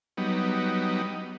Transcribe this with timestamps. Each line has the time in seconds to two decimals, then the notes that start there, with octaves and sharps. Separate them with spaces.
0.17 F#3 G3 B3 D#4